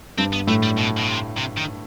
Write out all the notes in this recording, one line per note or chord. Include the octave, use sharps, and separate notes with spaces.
G2 C4
B3
A2 A3
G3
B2
B2
C3
C3
D#3